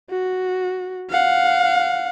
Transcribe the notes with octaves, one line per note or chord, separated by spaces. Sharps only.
F#4
F5 F#5